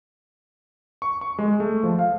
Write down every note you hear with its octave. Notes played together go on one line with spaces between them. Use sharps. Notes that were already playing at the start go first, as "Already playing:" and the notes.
C#6
C#6
G#3
A3
F3
F5